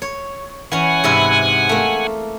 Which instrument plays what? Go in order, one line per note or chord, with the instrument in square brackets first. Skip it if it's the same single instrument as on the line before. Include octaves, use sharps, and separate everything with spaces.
[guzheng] C#5
[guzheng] E3 C#4 [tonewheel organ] F#5 G#5
[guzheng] G#2 C3 E4
A3 A#3